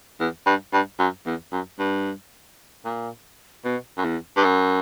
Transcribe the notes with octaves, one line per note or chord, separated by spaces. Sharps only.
E2
G2
G2
F#2
E2
F#2
G2
A#2
B2
F#2
E2
G2
F#2